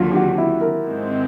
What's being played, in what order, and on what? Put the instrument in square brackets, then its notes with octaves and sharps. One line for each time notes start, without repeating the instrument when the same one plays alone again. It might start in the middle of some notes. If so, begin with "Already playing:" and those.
Already playing: [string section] D#2 D3 F#3 [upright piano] F4 F#4
[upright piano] G4
F#4
E4
A#4
[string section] G#2 D#3 G#3 C4